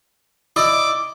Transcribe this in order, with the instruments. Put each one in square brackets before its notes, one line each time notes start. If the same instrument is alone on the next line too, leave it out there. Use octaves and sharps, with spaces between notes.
[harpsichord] E4 D5 D#5 [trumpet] D6